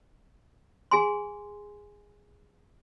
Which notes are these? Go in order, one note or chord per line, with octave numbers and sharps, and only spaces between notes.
G#4 G#5 C6